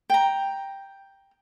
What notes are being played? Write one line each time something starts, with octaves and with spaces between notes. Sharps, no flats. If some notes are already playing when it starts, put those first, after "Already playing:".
G5 A#5